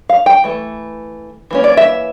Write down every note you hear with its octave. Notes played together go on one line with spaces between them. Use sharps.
F5
G5
E3 A3
E3 A#3 C#4
D5
E5